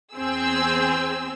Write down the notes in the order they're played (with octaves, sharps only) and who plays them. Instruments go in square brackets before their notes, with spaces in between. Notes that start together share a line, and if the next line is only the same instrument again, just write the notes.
[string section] E2 C4 G#4 E6